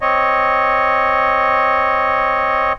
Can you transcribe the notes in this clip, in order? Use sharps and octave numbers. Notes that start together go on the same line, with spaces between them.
C4 C#5 D#5